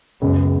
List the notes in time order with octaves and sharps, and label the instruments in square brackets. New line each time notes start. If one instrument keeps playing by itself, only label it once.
[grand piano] C#2 C#3 G#3 B3 [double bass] F#2